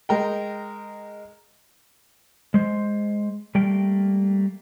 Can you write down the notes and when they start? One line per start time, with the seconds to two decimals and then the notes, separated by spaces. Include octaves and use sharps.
0.09 G#3 A#4 G5
2.54 G#3 C5
3.55 G3 A3 A#3 G5